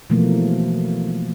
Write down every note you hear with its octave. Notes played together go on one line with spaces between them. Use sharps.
B2 E3 F3 A3 A#3